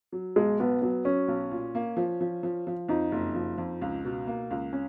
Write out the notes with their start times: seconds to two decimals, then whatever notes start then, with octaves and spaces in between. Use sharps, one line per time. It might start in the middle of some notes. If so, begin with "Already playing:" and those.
0.12 F#3
0.36 B1 G#3
0.60 B1 B3
0.82 F#3 B3
1.05 F#3 C#4
1.28 B1
1.51 A#2
1.75 A#3
1.97 F3
2.21 F3
2.43 F3
2.67 F3
2.89 F2 D#4
3.12 F#1
3.35 F3
3.58 F2
3.81 C#2
4.05 B2
4.27 A#3
4.51 C#2
4.73 C#4